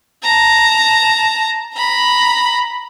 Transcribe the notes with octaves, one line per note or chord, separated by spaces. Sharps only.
A5 A#5
A#5 B5